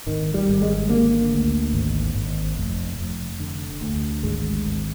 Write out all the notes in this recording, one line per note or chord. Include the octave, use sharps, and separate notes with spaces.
G#1 D#3
G3
G#1
G#3
D3 A#3
D2
G#1
G#1
F1
F1
D3
D2
G#1 G#3
G#1